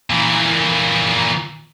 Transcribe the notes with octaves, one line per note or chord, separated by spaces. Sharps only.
A#2 E3